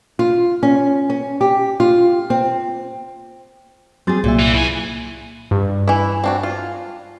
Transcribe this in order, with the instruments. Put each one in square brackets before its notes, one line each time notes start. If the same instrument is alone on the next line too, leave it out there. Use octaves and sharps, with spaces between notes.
[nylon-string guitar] F4
C#4
C#4
G4
F4
C4
[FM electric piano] F#3 C6 A6 [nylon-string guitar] C4 G#4
[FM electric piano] C2 E5 [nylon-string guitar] A#2
[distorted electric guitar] E3
[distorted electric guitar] B2 G#5 [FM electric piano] E4
[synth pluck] G2
[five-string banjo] E3 E4
C4 D4 F#4
F4